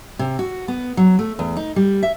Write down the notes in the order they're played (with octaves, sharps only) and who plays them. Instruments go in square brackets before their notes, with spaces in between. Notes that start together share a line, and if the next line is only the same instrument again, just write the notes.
[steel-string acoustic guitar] C3
F#4
B3
F#3
A3
E2
D#4
G3
E5